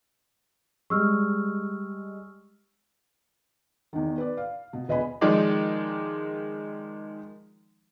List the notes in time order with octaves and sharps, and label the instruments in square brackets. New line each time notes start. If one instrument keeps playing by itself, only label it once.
[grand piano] G3 G#3 [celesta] C#6 E6 F6
[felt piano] E2 D#3
B4 D5
F5
B2
E1 B4 D#5 G#5 B5
[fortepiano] D#3 F3 G#3 D#4 D5